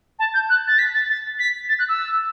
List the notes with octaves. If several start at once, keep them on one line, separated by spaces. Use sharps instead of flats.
A5
G6
F#6
A6
B6
A6
A6
B6
A6
F#6
E6